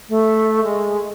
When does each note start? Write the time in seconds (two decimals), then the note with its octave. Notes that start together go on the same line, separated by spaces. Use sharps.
0.09 A3
0.64 G#3